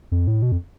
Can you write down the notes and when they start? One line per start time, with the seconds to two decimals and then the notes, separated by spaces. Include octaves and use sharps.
0.12 F2
0.27 A2
0.42 B2
0.52 F2